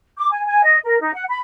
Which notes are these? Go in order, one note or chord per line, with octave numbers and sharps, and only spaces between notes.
D6
G#5
G#5
D#5
A#4
D#4
F#5
B5